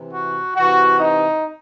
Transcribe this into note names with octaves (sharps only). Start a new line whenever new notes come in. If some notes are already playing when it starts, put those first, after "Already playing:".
Already playing: C3 E3
F#4
C3 E3 F#4
D#4